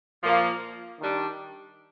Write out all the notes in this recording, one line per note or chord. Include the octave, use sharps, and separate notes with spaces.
A#2 F3 A#3 F4
D#3 G3 D4